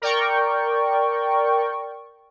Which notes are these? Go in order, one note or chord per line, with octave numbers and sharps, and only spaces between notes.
A#4 D5 G5 C#6